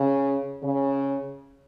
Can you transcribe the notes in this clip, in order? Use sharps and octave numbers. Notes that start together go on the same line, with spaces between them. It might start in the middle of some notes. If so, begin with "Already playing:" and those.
Already playing: C#3
C#3